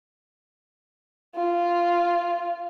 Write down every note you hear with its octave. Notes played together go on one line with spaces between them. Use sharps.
F4